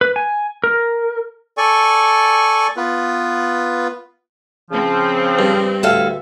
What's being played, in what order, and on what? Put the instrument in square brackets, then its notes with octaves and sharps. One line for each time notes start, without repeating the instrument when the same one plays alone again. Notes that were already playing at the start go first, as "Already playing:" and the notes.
[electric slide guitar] B4
G#5
A#4
[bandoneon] A4 D5 G#5 C#6
B3 F4 B4
[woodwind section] C#3 F3 [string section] C4
[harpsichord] G2
[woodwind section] D2 E5 [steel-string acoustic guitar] A2 A4 F5